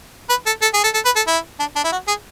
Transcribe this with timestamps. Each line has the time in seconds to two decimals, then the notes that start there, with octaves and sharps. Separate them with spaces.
0.29 B4
0.46 A4
0.62 A4
0.73 G#4
0.84 A4
0.94 A4
1.05 B4
1.16 A4
1.27 E4
1.59 D4
1.76 D4
1.84 E4
1.92 F#4
2.08 G#4